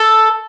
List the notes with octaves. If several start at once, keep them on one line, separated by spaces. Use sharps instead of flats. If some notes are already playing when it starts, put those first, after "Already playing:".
Already playing: A4